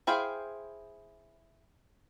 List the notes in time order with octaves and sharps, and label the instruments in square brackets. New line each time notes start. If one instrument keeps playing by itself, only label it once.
[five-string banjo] E4 G#4 C5 F5 G5